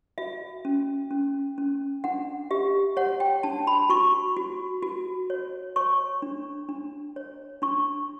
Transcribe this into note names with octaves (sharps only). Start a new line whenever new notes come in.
F#4 E5
C#4
C#4
C#4
D4 F#5
G4 E5
C#5 F#5
G5
D4 A5
B5
F#4 C#6
F#4
F#4
C#5
C#5 C#6
D4
D4
C#5
D4 C#6